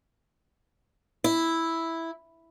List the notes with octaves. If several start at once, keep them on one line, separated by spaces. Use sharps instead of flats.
E4